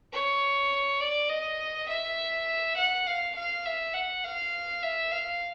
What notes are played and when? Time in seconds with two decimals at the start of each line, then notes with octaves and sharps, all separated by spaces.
0.12 C#5
1.00 D5
1.29 D#5
1.88 E5
2.76 F#5
3.07 F5
3.35 F5
3.66 E5
3.94 F#5
4.24 F5
4.83 E5
5.12 F5